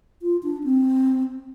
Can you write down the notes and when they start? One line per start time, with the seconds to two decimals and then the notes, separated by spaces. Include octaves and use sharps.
0.22 F4
0.43 D4
0.64 C4